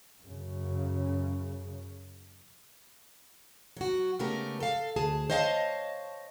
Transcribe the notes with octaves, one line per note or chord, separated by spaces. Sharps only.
F#2 C#3
F#3 F#4
C#3 G#3 A3 B3 G4 A#4
A4 F5
D2 G#4 A5
C5 C#5 D#5 F5 F#5 A5